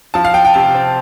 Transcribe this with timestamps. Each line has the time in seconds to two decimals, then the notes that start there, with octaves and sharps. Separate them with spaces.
0.14 F3 A5
0.25 F5
0.34 F3 G5
0.45 G5
0.54 C3 A5
0.74 C4